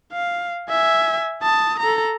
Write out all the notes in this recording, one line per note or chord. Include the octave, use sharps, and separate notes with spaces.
F5
E5 G#5
A5 D#6
A4 A#5